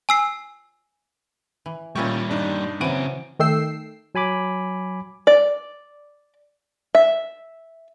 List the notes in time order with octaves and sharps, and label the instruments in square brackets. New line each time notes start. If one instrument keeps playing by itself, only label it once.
[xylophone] G#5 E6 C7
[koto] E3
[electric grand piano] A#2 C#6 [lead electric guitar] G3 A#3 [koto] C#4 E4 G4
[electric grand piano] G2 D4 D#4
[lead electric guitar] C#3 F#4 [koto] E3 F#3 [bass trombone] C4 [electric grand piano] D7 D#7
[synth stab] D#3 A3 G5 E6 C7
[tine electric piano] F#3 G#5 B5 D6
[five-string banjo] D5
E5